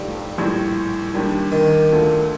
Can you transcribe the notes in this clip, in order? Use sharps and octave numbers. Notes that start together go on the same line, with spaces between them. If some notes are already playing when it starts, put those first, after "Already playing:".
Already playing: G1 G2 F3 G3 A3 D#4
A#1 A2 G3
D#2 D#3 G3 D4 G4
D#3
D2 D3 A3 D4 F4